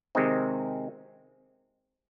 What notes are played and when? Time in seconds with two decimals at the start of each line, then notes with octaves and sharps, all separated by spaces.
0.15 C3 D#3 G#3 C4 D#4